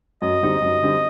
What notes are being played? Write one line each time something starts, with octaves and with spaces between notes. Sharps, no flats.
F#2 D#5
D3 G3 C4 D#4
F#2
D3 G3 C4 D#4